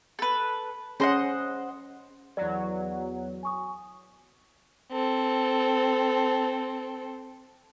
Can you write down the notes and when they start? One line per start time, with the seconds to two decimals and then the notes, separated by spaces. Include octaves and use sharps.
0.19 A4 B4
1.00 C#4 G#4 C5 D#5 F#5 C6
2.37 E2 F#3 D5
3.43 G#5 C#6 D#6
4.92 C4 A4